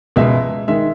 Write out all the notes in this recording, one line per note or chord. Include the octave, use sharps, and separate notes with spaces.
C#2 B2 G#3 E5
D#3 G#3 E5